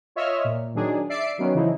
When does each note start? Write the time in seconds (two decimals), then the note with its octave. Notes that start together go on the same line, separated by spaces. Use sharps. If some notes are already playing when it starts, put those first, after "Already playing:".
0.16 F4 C#5 D#5 E5 F6
0.44 A#2
0.75 D#3 F#3 D4 G#4
1.09 D5 E5 C7 D7
1.38 D#3 F#3 B3 C#4
1.55 C#3 E3 F3 D#4 E4